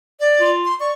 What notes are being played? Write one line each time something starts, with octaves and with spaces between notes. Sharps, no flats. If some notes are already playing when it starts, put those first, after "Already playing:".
D5
F4
C6
D5 C#6